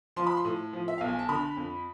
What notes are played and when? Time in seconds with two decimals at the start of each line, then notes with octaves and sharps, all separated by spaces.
0.16 F3 C6
0.27 B5
0.37 C6
0.45 A2
0.73 F3
0.88 E5
0.98 B1 F5
1.08 G#5
1.19 A5
1.29 D3 B5
1.57 F2